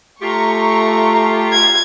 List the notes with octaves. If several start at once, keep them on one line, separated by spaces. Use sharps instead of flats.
A3 F4 G4 A#5 C#6
G#6